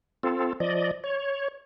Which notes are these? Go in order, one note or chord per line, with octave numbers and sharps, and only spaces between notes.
C4 F4 A4
F3 D5 D#5
C#5